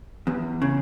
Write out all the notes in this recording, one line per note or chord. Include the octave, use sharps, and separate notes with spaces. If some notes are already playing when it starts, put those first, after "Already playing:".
E2
C#3